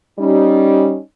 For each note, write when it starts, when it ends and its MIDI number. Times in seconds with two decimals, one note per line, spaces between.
0.19 0.98 55
0.19 0.98 61
0.19 0.98 63